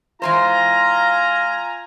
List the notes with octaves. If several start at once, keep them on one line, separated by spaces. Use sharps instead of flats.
E3 G#3 F4 C5 G#5 A#5